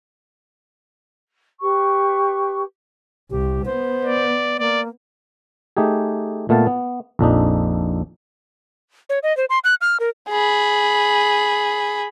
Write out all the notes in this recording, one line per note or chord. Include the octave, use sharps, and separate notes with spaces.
G4 B4 C#6
C2 G4
B3 C5
D5
A#3 D5
A3 D#4 G4 G#4
A#2 A3 B3 F5 A5
B3
A#1 F2 D4 D#4
C#5
D#5
C5
C6
F#6
F6
A#4
G#4 B5